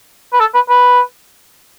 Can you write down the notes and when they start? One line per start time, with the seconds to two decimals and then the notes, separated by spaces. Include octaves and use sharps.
0.33 B4
0.40 A4
0.54 B4
0.69 B4